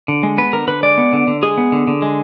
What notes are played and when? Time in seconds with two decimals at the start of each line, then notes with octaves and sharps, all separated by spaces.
0.08 D3
0.23 G#3
0.38 B3 B4
0.53 D3 A#4
0.68 D3 B4
0.83 G#3 D5
0.98 B3
1.13 D3
1.27 D3
1.43 G#3 G#4
1.58 B3
1.72 D3
1.87 D3
2.02 G#3